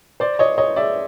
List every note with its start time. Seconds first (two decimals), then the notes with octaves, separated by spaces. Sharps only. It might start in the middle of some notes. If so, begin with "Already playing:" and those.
0.20 C5 D5
0.39 C#5 D#5
0.58 C#5 D#5
0.76 D5 E5